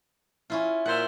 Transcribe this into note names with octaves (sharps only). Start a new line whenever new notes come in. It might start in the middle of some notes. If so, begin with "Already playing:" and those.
C#4 E4 F4
A#2 C5 E5 F#5